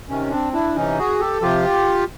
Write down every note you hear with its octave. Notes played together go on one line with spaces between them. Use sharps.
C3 D#3 C#4
C4 D4
D4 E4
C3 E3 C#4 D#4
F#4 G#4
G4 A4
C3 F3 F4 G4